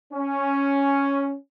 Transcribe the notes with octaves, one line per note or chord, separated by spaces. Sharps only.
C#4